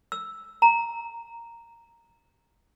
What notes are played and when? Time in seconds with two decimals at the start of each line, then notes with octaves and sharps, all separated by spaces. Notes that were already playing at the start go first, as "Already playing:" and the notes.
0.12 E6
0.62 A#5